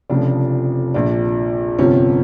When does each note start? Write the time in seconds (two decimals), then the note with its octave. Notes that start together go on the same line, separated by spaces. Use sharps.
0.10 F1 F2 C#3 F3 D4
0.94 A#1 A#2 F3 D4
1.78 G1 F2 C3 F3 C#4